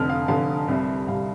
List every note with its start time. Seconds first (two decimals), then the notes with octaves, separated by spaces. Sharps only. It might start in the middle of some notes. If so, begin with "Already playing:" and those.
Already playing: F1 F2 D3 F6
0.10 F5
0.28 F1 F2 D3 F5
0.68 C2 C3 G3
1.08 C2 C3 G3 F5